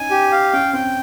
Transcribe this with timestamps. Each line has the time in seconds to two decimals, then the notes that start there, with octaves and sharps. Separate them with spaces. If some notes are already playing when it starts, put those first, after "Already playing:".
Already playing: C#4 D#4 G#5
0.10 G4
0.32 F5
0.53 C#4 G5
0.73 C4 G5